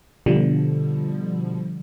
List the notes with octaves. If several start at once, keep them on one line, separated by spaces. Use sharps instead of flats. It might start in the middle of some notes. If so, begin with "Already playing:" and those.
B2 D3 F3 G3